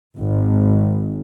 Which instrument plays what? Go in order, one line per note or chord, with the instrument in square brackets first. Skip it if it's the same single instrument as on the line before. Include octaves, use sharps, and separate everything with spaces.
[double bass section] G#1